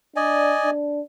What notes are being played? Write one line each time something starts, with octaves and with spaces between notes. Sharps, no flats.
D4 D5 D#5 G#5
D4